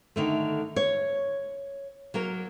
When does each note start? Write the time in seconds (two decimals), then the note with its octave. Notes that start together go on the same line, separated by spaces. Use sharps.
0.16 D3 D#3 A3
0.76 C#5
2.14 F#3 A#3 A#4